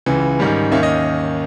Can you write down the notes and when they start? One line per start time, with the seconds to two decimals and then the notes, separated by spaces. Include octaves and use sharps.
0.06 C#2 C#3 E3
0.39 G#2 D#3 G3 C#4
0.72 D#2 D#3 A#3 C#4 E5
0.83 D#5